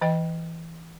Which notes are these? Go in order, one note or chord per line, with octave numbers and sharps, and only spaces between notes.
E3 D#5 G5